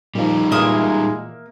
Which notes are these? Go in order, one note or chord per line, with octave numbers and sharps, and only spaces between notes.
A#2 D#3 F3 G3 D#4
A#2 E3 G#3 A#3 E5 D#6